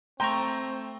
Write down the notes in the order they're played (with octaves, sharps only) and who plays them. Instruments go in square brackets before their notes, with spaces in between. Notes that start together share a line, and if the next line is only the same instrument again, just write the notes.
[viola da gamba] A3 [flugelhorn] C4 [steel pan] G5 A#5 [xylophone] C6 C#6